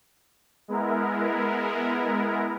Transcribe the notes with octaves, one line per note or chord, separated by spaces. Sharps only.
G#3 B3 E4 A#4